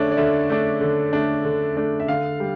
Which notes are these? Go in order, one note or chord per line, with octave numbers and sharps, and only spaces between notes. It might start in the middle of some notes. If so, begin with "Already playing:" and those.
Already playing: D3 A3 D4 C#5
D5
D3 E5
A3 D4
D3
A3 D4
D3
A3 D4
E5
D3 F5
G3